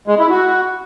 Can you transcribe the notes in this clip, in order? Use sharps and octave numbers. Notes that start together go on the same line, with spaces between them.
G#3
E4
F#4